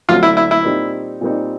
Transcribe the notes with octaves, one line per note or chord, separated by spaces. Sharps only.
D2 D3 F#3 A3 C4 F4
E4
E4
E4
A#2 G3 C4 D#4
A#2 G3 C4 D#4